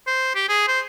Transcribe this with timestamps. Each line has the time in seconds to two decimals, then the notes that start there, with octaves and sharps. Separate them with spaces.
0.07 C5
0.35 G4
0.49 G#4
0.68 C5